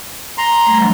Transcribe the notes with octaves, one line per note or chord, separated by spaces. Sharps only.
A#5 C6
G3 A3
E3 F#3 D4